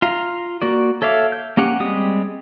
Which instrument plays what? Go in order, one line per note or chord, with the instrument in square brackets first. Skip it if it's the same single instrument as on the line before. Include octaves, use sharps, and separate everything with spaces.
[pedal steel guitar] F4 F5 A#5
A#3 F#4 D5
A4 C#5 E5 F5 D6
G6
A#3 C#4 G4 F#5
G3 G#3 C4 G4 D#6